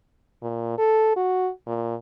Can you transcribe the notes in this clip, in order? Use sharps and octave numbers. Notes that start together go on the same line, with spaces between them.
A#2
A4
F#4
A#2